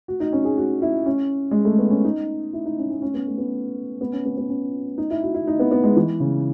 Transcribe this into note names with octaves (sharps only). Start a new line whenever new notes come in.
F#4
D#4
C#4
G#4
F#4
E4
C#4
G#3
A3
B3
C#4
D#4
E4
D#4
C#4
C#4
C#4
B3
A3
B3
B3
C#4
B3
B3
C#4
D#4
E4
F#4
E4
D#4
B3
B3
G#3
E3
C#3